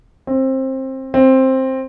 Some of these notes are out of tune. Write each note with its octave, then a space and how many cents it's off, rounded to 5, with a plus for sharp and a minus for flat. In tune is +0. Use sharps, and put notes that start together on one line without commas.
C4 +20
C4 +10